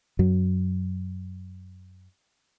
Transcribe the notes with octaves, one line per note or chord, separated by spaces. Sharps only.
F#2 F#3